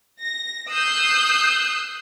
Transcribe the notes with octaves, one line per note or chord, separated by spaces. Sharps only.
A#6
D#6 E6 F#6 G6 C7